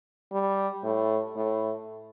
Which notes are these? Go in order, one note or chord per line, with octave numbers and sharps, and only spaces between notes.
G3
A2
A2